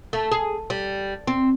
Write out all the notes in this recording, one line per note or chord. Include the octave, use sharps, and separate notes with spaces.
A3
G#4
G3
C4